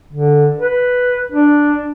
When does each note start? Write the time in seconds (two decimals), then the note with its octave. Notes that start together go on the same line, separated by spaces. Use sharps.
0.13 D3
0.58 B4
1.32 D4